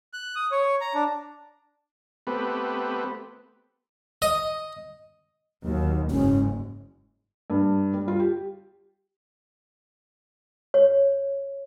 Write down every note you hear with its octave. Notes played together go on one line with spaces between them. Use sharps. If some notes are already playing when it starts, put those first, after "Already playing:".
F#6
D#6
C#5
A#5
D4
A3 B3 C4 G4 B4
D#5
D#2 F#3
F#1 G#2 C#4
G2
G3
F4
G4
C#5